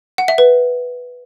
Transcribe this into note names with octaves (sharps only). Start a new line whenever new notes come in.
F#5
E5
B4